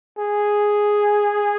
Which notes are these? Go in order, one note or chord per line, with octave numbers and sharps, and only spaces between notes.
G#4